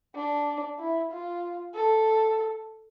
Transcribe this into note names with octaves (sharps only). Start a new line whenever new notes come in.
D4
E4
F4
A4